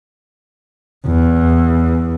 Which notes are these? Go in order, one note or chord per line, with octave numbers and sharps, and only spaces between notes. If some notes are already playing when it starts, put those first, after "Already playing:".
E2